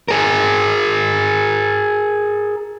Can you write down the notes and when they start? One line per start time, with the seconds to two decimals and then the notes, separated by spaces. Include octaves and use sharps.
0.08 G#4 A#4